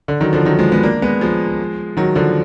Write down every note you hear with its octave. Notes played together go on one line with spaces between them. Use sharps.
D3
D#3 F#3
D3 F3
D#3 F#3
F3 G#3
G#3 B3
A#3 D4
G#3 B3
F3 G#3
D#3 F#3
D3 F3